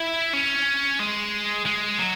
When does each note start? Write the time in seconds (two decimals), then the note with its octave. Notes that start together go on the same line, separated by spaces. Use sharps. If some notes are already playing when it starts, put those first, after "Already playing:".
Already playing: E4
0.33 C#4
0.99 G#3
1.65 G#3
1.99 F#3